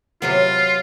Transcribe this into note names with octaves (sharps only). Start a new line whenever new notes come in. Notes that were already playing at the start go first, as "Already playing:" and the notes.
C3 F#3 B3 F4